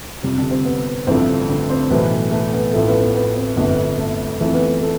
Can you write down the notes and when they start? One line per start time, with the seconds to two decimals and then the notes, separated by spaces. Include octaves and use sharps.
0.23 F2 C3 G3
0.38 D3 D4
0.51 C4
0.65 B3
1.07 A1 G2 D3 F3 A3 C4
1.48 D3 D4
1.69 C4 C5
1.90 B1 A2 E3 A3 B3 B4
2.31 A3 A4
2.53 B3 B4
2.73 A1 A2 F3 A3 A4
2.88 B3 B4
3.01 B3 B4
3.15 B3 B4
3.36 C4 C5
3.56 G1 F2 D3 A3 B3 B4
3.98 A3 A4
4.40 F2 E3 A3
4.53 B3 B4
4.82 A3 A4